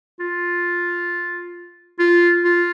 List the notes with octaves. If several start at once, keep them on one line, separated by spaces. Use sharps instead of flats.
F4
F4
F4